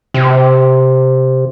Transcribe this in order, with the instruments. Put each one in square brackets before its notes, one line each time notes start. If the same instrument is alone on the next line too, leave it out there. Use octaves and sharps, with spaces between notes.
[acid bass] C3